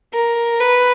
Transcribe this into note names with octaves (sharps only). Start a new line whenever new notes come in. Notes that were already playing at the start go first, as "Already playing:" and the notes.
A#4
B4